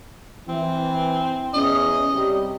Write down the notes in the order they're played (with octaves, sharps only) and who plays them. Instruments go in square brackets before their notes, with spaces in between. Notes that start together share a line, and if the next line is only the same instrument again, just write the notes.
[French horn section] E3 [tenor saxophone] C4
[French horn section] E2 C#4 [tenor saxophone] D#5
[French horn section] C3 G3 G4